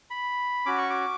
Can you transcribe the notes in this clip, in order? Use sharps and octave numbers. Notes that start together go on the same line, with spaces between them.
B5
C#4 F#4 D6
C#6
D6